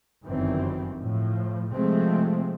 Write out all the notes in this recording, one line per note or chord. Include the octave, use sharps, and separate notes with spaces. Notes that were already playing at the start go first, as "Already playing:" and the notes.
G1 F#2 D#3 E3 C4
A2 F3
C3 F3 G#3 A3 C4